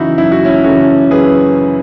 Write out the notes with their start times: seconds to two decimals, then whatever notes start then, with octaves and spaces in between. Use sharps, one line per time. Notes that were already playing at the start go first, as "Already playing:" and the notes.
Already playing: F#2 C#3 E3 D#4 E4 F#4
0.18 F#2 E4
0.32 F#4
0.45 C#4 E4
0.64 C#3 E3 F#4 A4
1.11 F#2 G#4 B4